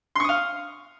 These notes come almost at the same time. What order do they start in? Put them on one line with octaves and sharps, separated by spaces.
C6 C#6 D#6 F5